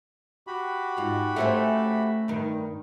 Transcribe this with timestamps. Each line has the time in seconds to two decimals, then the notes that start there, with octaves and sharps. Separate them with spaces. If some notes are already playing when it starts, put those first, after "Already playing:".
0.47 F#4 G4 B5
0.97 G#2 F4
1.36 A3 C#4 C5
2.28 G2 D#3